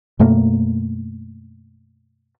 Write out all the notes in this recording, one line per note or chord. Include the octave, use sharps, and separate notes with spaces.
F#2 B2 A3 A#3